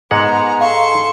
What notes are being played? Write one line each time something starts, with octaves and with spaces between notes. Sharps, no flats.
G#2 G#3 B3 F#5 A#5
A4 F5 C6 C#6